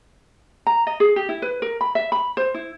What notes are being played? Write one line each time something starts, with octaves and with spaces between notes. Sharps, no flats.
A#5
D#5
G#4
G4
E4
B4
A#4
B5
E5
B5
C5
E4